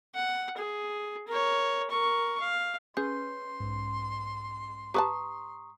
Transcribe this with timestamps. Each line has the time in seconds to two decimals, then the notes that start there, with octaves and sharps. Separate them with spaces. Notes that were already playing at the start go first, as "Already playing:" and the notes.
0.15 F#5
0.57 G#4
1.28 A#4 C#5
1.90 A#4 C#6
2.40 F5
2.97 C#4 G#4 B4 C6 G6
3.60 B1 G#2
4.94 G4 B4 A5 A#5 C#6 D#6